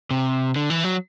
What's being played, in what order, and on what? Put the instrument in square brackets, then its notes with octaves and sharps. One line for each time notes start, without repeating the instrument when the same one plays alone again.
[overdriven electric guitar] C3
D3
E3
F#3